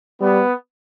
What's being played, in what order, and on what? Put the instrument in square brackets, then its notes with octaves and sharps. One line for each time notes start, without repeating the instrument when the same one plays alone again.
[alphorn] G3 [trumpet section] B3